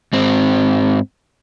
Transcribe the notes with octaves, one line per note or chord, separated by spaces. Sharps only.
G#2 C4